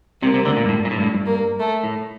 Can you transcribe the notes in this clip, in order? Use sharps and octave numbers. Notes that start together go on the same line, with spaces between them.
C2 C3 A#3
C2 C3
D2 D3
A#2
G2
A2
G2
A#2
A2
G2
A2
G2
A#3
A3
A2